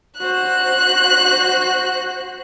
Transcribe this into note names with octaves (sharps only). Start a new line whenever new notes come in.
F#4 C5 F#6